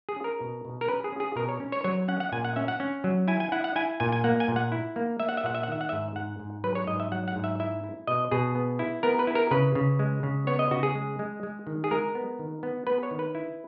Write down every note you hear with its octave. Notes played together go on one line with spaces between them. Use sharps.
G#4
C#4
A#4
B2
B2
A#4
C#4 B4
G#4
C#4
G#4
B2 A#4
C#5
C#4
C#5
F#3 C#5
C#4 F#5
F#5
A#2 G#5
F#5
C#4 E5
F#5
C#4
F#3
E4 G#5
G#5
E4 F#5
F#5
E4 G#5
A#2 G#5
G#5
A#3 F#5
G#5
A#2
F#5
E4
A#3
A#3 E5
F#5
E5
A#2 F#5
E5
F#5
D#3 E5
F#5
G#2 E5
G#2 F#5
G#2
F#3 B4
C#5
G#2 D#5
E5
F#3 F#5
F#5
G#2
E5
E4 E5
E4
B2 D#5
B2 G#4
B3
E4
B3 A#4
B4
E4
A#4
C#3 B4
C#3
G#3
C#3
B3 C#5
D#5
C#3 F#4
G#4
G#3
G#3
G#3
D#3
G#4
G#3 A#4
B3
D#3
B3
B3 B4
C#5
D#3
B4
E4